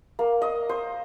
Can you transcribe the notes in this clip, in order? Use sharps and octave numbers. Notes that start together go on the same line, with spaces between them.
A#3
D#5
C5